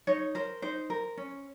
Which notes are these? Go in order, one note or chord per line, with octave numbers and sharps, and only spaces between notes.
D#4 C#5
A#4 C5
D#4 C5
A#4
C#4